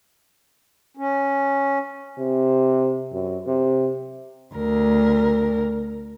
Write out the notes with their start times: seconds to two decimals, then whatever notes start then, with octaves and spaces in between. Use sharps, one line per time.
0.97 C#4
2.18 C3
3.13 F#2
3.47 C3
4.55 D2 A#4